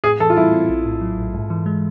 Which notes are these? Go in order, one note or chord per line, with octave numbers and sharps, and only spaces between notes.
A2 G#4
E3 A4
F4
G3 E4
C4
A#1
A2
F#3
A#1
G#2
E3
G#3